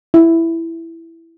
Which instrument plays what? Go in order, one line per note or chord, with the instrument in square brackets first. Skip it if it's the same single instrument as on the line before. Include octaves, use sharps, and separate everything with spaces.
[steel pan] E4